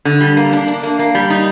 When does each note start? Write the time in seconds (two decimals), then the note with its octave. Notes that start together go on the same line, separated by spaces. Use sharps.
0.05 D3
0.20 G3
0.37 A#3
0.53 D4
0.68 D4
0.83 A#3
0.99 A#3
1.15 G3
1.30 D#4